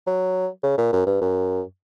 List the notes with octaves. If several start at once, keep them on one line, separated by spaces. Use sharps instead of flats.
F#3
C#3
A#2
F#2
G2
F#2